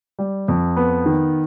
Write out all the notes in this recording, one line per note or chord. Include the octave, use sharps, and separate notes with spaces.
G3
F2
B3
D#3